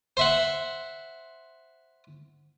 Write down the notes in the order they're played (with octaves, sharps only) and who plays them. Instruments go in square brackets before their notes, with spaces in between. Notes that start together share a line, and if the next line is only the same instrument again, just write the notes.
[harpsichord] C5 E5 F#5